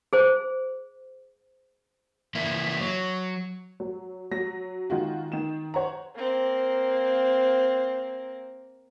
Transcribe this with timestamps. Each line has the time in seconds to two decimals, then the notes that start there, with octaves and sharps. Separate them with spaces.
0.13 G#4 C5
2.35 E3 A#3 E4
2.81 F#3
3.80 F#3
4.31 F#3 A#6
4.90 D#3 G#3 F4 F#4
5.32 D#3 E7
5.74 C5 C#5 F#5 A#5
6.15 A#3 C4